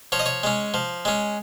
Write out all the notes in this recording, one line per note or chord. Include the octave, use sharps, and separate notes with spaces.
F3 C#5
D#5
C#5
G#3 C#4
F3
G#3 C#4